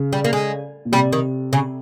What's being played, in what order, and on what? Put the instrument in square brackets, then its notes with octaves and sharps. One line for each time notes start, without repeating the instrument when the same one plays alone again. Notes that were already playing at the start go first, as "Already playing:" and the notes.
Already playing: [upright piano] C#3
[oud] G3
A#3
G#3
[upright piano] A#2
[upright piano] C3 [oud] G3
[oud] D#3
C#3